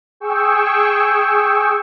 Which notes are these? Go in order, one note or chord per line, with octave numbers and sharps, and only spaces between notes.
G#4 G5 C#6 E6